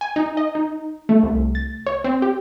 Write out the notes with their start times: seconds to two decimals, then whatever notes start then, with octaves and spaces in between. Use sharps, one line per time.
0.01 G#5
0.16 D#4
0.37 D#5
0.55 D#4
1.09 A3
1.23 C2
1.55 A6
1.87 C#5
2.04 C4
2.22 G4